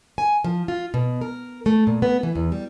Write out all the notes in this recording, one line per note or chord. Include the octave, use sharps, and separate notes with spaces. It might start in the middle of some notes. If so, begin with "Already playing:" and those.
G#5
F3
F4
B2
A#4
A3
A#2
B3
E3
E2
G3